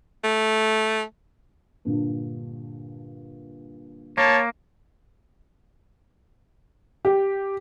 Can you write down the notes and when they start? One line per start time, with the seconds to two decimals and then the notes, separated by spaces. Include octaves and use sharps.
0.24 A3
1.85 G2 A#2 D3
4.18 A#3 C#5 A5
7.05 G4